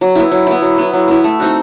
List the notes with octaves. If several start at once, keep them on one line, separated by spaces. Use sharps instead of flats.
F#3
B3 E4
F#3
B3 E4
F#3
B3 E4
F#3
B3 E4
A3
C4 D#4 F#4